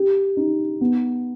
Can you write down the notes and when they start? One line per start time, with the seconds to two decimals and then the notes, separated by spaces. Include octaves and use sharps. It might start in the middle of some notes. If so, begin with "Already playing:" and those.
Already playing: G4
0.37 D#4
0.81 B3